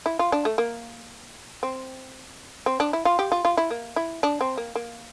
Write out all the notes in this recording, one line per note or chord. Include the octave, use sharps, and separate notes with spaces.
E4
F4
D4
A3
A#3
C4
C4
D4
E4
F4
G4
F4
F4
E4
A#3
E4
D4
C4
A#3
A#3